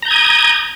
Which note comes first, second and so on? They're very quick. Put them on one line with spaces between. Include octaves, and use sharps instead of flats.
A#5 G6 G#6 D#6